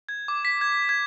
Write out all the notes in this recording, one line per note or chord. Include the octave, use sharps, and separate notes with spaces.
G#6
D6
B6
G#6
G#6